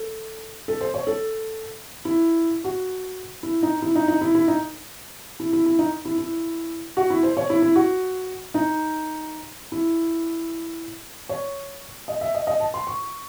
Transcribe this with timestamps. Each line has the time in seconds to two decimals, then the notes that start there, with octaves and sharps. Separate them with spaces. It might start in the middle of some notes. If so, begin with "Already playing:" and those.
Already playing: A4
0.68 A4
0.81 C5
0.94 C#5
1.07 A4
2.05 E4
2.64 F#4
3.43 E4
3.63 D#4
3.82 E4
3.95 D#4
4.08 D#4
4.21 E4
4.35 E4
4.48 D#4
5.40 E4
5.53 E4
5.66 E4
5.79 D#4
6.05 E4
6.18 E4
6.97 F#4
7.10 E4
7.23 C5
7.37 C#5
7.50 E4
7.62 E4
7.76 F#4
8.54 D#4
9.72 E4
11.29 C#5
12.08 D#5
12.21 E5
12.35 D#5
12.47 D#5
12.60 A5
12.74 C6
12.87 C#6